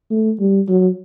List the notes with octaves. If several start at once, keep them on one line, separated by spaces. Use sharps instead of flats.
A3
G3
F#3